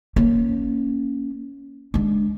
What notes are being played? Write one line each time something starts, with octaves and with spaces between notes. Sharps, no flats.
A#3 C#4
G#3 D4